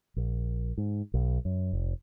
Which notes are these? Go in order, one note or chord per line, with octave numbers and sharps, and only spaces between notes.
A#1
G#2
B1
F#2
F1